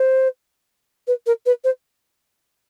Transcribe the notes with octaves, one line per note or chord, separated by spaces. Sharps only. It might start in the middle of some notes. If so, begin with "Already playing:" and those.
Already playing: C5
B4
A#4
B4
C5